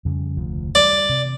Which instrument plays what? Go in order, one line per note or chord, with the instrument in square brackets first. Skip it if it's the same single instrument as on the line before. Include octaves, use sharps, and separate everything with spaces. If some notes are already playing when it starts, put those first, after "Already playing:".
[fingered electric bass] F2 C#3 G3
F1 D2 F3
[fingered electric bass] G3 [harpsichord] D5
[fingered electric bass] C3